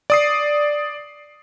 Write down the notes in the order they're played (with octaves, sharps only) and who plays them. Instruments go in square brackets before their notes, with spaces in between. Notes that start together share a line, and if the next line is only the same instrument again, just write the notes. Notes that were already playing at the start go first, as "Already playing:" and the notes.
[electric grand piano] D5 D#6 C7